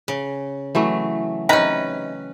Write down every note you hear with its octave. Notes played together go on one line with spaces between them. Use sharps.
C#3
E3 F#3 A3
C3 C#4 D#4 B4 A#5